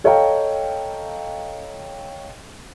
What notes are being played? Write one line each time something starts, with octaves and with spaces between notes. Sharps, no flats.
A4 C#5 D#5 F5 G5 A#5